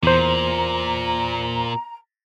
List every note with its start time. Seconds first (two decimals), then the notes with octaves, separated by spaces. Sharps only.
0.03 E2 A#2 C5 A#5